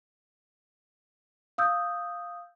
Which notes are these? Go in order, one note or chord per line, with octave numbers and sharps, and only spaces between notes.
F5 D#6 E6 G6